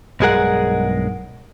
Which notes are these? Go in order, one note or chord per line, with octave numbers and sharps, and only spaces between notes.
B1 G2 G#3 G#4 A#4 F#5